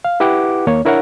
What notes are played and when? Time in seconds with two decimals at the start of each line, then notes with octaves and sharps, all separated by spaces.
0.05 F5
0.20 E4 G4 B4 F#5 G5 D6
0.67 D#2 A#3 C#5
0.85 D4 E4 A#4 C#5 E5 F#5